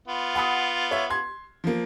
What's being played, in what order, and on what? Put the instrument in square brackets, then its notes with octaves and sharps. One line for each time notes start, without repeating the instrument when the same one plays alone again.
[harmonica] B3 F4
[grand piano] F#5 B5 D#6
C#5 E5
C6 G#6
F3 A#3